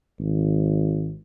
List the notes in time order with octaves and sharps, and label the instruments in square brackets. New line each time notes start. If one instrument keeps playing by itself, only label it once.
[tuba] G#1